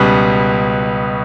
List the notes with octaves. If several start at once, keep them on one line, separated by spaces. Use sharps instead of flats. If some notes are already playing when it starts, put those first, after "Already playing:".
Already playing: C#2 B2 G3 B3 F#6